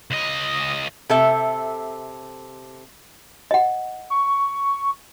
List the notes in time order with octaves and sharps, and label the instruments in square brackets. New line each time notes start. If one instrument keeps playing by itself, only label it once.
[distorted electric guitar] C#2 D#5
[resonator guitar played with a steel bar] C3 A4 E5
[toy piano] D#5 F#5
[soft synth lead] C#6